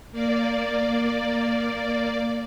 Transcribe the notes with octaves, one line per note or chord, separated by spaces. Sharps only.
A#3 D5